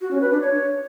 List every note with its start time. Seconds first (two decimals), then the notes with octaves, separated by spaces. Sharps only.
0.01 F#4
0.11 C#4
0.21 B4
0.31 D4
0.41 C#5